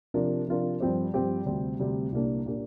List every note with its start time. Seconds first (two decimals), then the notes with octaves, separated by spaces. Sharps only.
0.14 C3 F3 D4 F4 A#4
0.48 C3 F3 D4 F4 A#4
0.80 G2 F3 C4 G4 C5
1.14 G2 F3 C4 G4 C5
1.46 D2 C3 G3 C4
1.79 D2 C3 G3 C4
2.12 C2 A#2 A#3 D4 G4
2.46 A#2 A#3 D4 G4